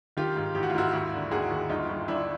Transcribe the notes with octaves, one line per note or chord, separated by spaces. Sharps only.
D#3 F4 G4
G#2
A1 G4
F#4
F4
G#2 E4 F#4
D#2 E4 F#4
D3
D#2 F#4 G#4
D#2
G1 D#4 F4
G1
G1 D4 E4